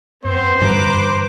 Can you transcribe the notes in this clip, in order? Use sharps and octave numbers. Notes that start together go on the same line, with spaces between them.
F#2 B3 C4 C5
G2 D3 E3 B4 A#5 D6